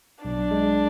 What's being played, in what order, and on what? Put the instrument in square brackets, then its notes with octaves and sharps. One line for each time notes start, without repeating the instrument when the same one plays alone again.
[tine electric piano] B1 [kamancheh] D4
[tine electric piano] G#3